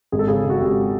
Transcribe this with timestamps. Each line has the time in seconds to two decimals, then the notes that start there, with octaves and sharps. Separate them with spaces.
0.12 G#1 G#4
0.19 A4
0.28 C#3 G#4
0.45 C#3
0.50 F#4
0.61 G#1 G4